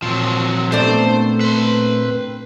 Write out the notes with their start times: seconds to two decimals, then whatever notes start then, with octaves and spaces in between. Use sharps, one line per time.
0.02 A#2 F3 F#3 C4
0.72 A3 B3 D4 C5
1.41 B4 C6